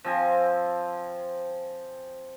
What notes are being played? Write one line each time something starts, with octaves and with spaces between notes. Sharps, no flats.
F3 C4 G#5